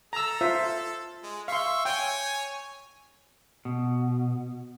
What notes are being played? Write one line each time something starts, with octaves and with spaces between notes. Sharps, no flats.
A4 A#5 E6
F4 C5 E5
G#3
E5 F5 C6 C#6
C#5 G5 G#5
B2